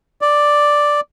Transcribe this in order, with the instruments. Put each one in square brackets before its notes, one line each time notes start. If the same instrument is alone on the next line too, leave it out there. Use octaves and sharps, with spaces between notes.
[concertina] D5